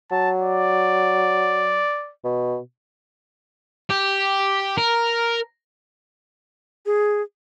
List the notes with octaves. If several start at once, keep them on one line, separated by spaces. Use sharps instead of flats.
F#3 A5
D5
B2
G4
A#4
G#4